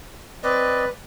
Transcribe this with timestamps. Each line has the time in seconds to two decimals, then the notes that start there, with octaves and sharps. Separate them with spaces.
0.43 C4 B4 D5 D#5